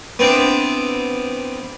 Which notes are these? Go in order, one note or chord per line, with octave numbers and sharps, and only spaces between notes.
B3 C4 D4 E4